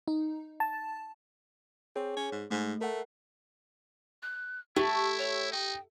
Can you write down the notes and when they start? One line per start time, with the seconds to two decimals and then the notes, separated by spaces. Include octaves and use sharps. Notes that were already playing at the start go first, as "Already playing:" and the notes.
0.08 D#4
0.60 A5
1.96 C4 G#4 C#5
2.17 C#4
2.32 G#2
2.50 G#2 A3
2.81 A3 A#4 F#5
4.22 F#6
4.76 A3 E4 G4 C#6
5.18 C#5
5.52 D#4 G5